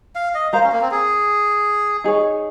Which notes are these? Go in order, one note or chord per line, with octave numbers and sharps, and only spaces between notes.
F5
D#5
A#4 C5 F5 A#5
C#4
A#3
C4
G#4
D#4 G#4 C#5